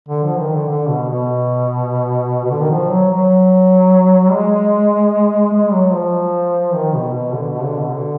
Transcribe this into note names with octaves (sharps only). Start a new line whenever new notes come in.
D3
F3
D#3
D3
D3
B2
B2
B2
D3
D#3
F3
F#3
F#3
G#3
G#3
F#3
F3
D#3
B2
B2
D3
B2
D3
B2
D3